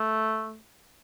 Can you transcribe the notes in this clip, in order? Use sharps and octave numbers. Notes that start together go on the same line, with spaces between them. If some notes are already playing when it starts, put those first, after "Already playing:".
Already playing: A3